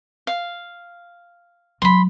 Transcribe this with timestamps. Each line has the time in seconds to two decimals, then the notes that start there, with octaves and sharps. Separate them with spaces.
0.27 F5
1.82 F#3 G#3 B5 C6